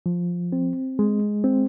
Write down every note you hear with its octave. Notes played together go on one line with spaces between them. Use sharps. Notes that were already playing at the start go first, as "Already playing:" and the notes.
F3
C4
G#3
C4